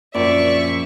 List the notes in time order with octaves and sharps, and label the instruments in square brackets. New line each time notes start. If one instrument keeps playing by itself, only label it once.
[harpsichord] A#1 [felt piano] F#2 [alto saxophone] D5 [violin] E5 C#6